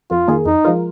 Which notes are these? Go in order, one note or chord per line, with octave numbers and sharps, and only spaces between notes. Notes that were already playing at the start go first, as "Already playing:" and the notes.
F2 F4
D#3 A#3 G#4
F2 D#4
F3 G#3 F4 A#4